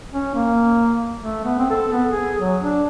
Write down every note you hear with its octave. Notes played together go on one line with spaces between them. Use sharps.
C#4
A#3
A3
B3
C4
A4
B3
G#4
F#3
D4